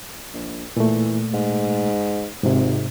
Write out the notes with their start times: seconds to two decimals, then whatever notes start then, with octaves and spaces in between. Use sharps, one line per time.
0.34 A#1
0.77 A#2 E3 A3
1.33 G#2
2.43 G#1 G#2 C3